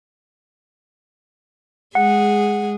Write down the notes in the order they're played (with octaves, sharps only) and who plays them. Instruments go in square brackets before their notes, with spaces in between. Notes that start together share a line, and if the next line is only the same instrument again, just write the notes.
[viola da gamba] G#3 G#4 [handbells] F#5